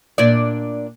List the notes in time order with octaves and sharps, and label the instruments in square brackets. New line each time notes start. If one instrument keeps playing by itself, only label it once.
[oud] A#2 D4 D5